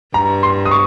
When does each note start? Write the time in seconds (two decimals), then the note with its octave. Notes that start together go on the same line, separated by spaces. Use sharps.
0.14 G2 A#5
0.43 C6
0.65 D#6
0.71 C#6